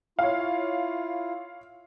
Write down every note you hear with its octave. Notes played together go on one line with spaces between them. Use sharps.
E4 F4 C#5 F5